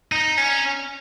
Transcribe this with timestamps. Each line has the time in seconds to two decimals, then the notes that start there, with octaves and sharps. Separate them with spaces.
0.12 D#4
0.37 C#4